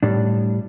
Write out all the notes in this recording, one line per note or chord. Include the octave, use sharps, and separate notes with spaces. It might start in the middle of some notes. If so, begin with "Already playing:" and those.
A2 G3 D4